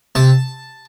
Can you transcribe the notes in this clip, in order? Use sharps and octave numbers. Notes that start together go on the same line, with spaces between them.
C3 A5